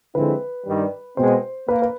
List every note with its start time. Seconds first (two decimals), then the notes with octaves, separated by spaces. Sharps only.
0.14 D3 F3 G#3 C4 E4 B4
0.67 G2 D#3 G3
1.17 B2 G#3 C4 C5
1.68 A#3 B4
1.82 B4